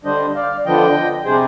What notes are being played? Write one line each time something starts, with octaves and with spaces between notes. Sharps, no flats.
D3 G3 D4 C5 D#5
D5 F5
D3 F3 B3 D4 D#5 G5
C3 G3 D4 G#4 C5